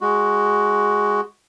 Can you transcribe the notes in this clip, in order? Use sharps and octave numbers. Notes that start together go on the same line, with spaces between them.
G#3 F#4